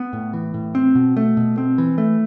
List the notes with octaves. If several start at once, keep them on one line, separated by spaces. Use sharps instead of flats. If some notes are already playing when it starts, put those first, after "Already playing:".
Already playing: B3
A2
E3
A2
C4
B2
A3
B2
C4
E3
A3